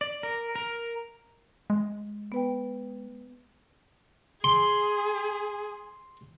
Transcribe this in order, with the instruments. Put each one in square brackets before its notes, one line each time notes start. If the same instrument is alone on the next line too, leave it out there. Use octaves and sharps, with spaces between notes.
[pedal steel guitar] D5
A#4
A#4
[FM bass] G#3
[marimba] B3 B4 G5
[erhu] G#4 [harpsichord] C6